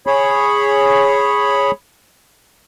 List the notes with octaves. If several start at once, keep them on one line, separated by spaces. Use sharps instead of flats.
G#4 C#5 B5